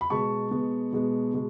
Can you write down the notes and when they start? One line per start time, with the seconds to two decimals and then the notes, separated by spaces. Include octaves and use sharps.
0.01 B5
0.10 B2 G#3 B3 A5 C#6
0.51 B2 G#3 B3
0.92 B2 G#3 B3
1.33 B2 G#3